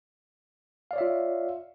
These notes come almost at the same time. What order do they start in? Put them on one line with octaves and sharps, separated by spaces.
F5 D5 C#5 E5 F4